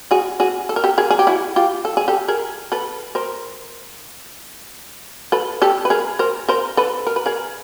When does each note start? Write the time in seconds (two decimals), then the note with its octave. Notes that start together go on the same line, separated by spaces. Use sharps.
0.11 F#4 G#4
0.40 F#4 G#4
0.69 A4
0.76 A#4
0.84 G4 A4
0.98 G#4 A#4
1.11 G#4
1.19 G4
1.27 E4 F#4
1.56 F4 G4
1.85 A4
1.97 G#4
2.08 G4 A4
2.28 G#4 A#4
2.72 A4 B4
3.15 A#4 C5
5.32 A4 B4
5.62 G4 A4
5.85 B4
5.90 G#4 A#4
6.19 A#4 C5
6.49 A#4 C5
6.77 A4 B4
7.07 A#4
7.16 B4
7.26 G#4 A#4